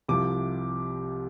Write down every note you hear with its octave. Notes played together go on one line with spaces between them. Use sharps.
C2 C3 F3 D6